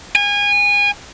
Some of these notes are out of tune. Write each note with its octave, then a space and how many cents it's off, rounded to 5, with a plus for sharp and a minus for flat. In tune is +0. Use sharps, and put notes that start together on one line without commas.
G#5 -25